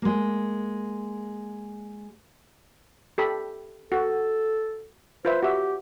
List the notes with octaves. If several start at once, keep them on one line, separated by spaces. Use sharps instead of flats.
G#3 A#3
G4 A4 B5
F#4 A4
F4 B4 C5 E5
F#4 G4 E5